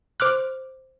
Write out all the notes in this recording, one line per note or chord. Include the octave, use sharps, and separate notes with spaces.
C5 D6 F6 F#6